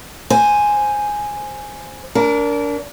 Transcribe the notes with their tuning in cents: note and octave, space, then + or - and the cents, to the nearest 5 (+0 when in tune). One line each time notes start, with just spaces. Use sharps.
C5 +0 G#5 +0
D4 -30 A#4 +0